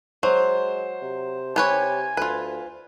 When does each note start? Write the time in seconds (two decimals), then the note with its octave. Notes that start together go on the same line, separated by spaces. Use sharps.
0.23 F#3 G#3 C5
1.02 C3
1.56 C3 G4 B4 C#5 G#5
2.17 D2 F4 B4